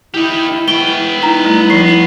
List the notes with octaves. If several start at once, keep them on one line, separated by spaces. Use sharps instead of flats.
D#4 E4 G4
B3 G5 C#6 G7
D#4 E4 A#5
G3 A3 E4
F3 E4 C7